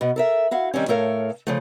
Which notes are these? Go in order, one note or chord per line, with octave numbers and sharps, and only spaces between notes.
B2 B3
A4 A#4 E5
E4 F#4 F5
D#3 G3 C4 C#4
A2 A3 A4 A#4 C#5 F5
C#3 F3 A3